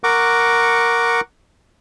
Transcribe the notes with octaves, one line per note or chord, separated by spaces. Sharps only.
A#4 F#5 C#6 D6